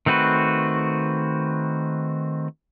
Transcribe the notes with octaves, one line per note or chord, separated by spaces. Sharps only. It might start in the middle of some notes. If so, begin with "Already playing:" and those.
D#3 A3 C4 F#4 B4